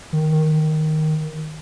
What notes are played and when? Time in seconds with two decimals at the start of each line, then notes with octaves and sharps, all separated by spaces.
0.13 D#3
0.32 D#3